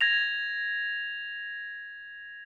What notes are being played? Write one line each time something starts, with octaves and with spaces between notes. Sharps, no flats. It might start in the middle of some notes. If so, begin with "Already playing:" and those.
G#6 A#6 F7